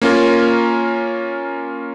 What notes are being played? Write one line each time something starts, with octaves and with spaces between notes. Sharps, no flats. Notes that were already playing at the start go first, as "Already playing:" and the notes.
A#3 C#4 F4 A#4